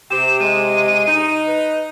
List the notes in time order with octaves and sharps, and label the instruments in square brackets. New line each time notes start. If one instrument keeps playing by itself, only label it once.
[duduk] C3 [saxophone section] C4 G4 [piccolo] E7
[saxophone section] G#3 [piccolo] D#7
[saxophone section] D#4
[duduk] B4